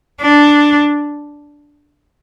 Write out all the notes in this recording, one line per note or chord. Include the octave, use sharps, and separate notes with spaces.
D4